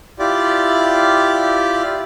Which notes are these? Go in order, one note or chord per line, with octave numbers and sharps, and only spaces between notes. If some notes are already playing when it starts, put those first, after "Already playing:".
E4 F4 G4 D5